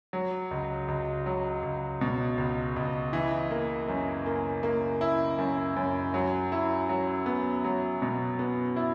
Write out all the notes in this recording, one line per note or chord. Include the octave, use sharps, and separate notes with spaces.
F#3
C#2
C#2
F#3
C#2
B2
C#2
C#2
E3
A#3
F#2
A#3
A#3
E4
F#2
F#2
F#3
E4
F#3
B3
F#3
B2
B3
E4